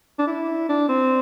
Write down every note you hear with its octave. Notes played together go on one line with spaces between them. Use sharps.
D4
E4
D4
C4